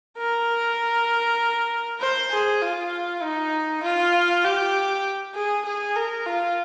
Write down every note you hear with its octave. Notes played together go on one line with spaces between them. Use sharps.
A#4
C5
G#4
F4
D#4
F4
G4
G#4
G#4
A#4
F4